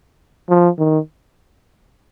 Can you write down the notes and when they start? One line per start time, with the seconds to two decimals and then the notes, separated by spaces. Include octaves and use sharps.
0.49 F3
0.78 D#3